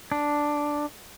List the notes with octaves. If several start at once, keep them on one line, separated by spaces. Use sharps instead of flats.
D4